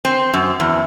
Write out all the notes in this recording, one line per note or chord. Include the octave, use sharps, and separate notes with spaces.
C4
F#2
E2